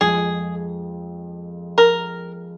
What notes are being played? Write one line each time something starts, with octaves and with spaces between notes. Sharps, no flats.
F2 F3 G#3 F4 G#4
A#4